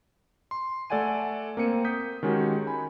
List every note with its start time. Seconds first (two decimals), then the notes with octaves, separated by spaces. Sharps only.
0.51 C6
0.90 A3 A4 D5 F#5 G#5 D#7
1.57 A#3 C4 C#7 D#7
1.85 D#6 G6 B6
2.23 D#3 G#3 C#4 F#4 G4
2.67 G#5 B5